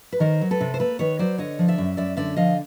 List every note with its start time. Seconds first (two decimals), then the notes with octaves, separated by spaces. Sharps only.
0.12 B4
0.20 D#3 A#4 C5
0.41 F#3
0.51 A4 B4
0.61 C3
0.74 C5
0.80 A#3 A4 B4
0.99 D#3 B4 C#5
1.19 F#3 C5 D5
1.38 D3 C#5 D#5
1.59 F3
1.68 D5 E5
1.78 F#2
1.97 F#2 D5 E5
2.17 D3 D5 E5
2.36 F3 D#5 F5